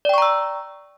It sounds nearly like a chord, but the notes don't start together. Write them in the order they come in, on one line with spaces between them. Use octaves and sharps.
D5 G5 C#6 A#5 E6